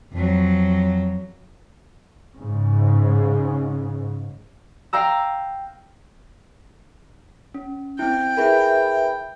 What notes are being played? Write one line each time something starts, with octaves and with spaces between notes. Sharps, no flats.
F2 F#3
G#2 C#3
F5 G5 A#5 E6
C#4
C4 E4 G5
E4 G#4 A#4 B4 E5 B5